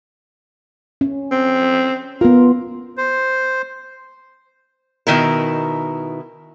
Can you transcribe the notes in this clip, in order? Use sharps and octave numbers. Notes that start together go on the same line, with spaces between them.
C#4
C4
B3 F4 A#4
C5
B2 D#3 E4 A#4